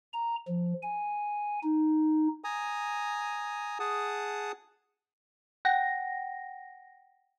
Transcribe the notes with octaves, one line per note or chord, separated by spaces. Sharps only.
A#5
F3
G#5
D#4
G#5 A#5 D#6
G#4 F#5 A5 D#6
F#5 G5 A#6